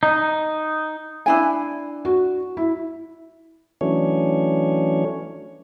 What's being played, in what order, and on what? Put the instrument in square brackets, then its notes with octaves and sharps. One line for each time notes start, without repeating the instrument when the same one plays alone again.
[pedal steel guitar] D#4
[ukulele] D4 E4 G#5
[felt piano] F#4
E4
[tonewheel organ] E3 F#3 A3 C#4 D4 C#5